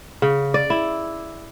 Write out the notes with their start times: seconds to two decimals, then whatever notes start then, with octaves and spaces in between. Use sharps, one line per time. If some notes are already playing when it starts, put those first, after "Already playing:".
0.22 C#3
0.54 D5
0.70 E4